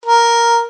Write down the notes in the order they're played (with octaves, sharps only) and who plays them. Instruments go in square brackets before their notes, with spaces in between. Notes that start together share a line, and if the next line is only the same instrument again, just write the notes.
[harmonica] A#4